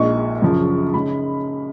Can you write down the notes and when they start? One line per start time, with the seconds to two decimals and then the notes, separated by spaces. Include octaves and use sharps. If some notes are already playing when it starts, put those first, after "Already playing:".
Already playing: A#1 A#2 G#3 D#4 C#6
0.42 F#2 C#3 F3
0.94 C#3 G#3 D#4 B5